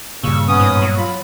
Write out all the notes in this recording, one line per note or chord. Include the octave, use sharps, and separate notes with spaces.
G2 A#2 C#3 C#6 E6
B3 C#4 D#6
G#2
F#3
F4 B5